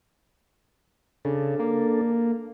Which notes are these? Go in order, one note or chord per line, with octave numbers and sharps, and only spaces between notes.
C#3 D4 A4
A#3